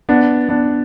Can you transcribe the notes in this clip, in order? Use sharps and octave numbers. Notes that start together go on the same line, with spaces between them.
B3 D4
B3 D4